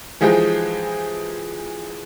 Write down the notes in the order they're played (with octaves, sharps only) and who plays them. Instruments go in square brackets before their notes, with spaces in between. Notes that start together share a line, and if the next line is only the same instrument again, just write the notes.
[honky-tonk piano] E3 F3 G#3 D#4 G4 G#4